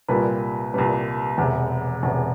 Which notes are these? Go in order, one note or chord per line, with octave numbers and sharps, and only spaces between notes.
C2 A#2 G3 B4
C2 A#2 G3 B4
E1 E2 C3
E1 E2 C3